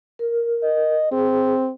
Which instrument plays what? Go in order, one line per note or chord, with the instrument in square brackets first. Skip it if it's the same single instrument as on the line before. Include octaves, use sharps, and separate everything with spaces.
[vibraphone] A#4
[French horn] D#5
[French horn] C4 [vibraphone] G#4